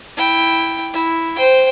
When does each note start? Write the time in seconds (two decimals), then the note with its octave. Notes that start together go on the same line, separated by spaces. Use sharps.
0.16 E4 G5
0.93 E4
1.36 C5 G5